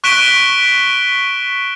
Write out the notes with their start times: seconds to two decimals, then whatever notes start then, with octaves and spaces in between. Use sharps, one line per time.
0.04 C#6 F#6 B6 D7 E7 G7